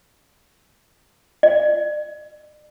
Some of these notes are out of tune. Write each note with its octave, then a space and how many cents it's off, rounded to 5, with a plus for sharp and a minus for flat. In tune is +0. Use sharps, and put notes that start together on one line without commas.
D5 +40